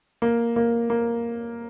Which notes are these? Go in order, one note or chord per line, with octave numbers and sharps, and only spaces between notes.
A#3
A#3
A#3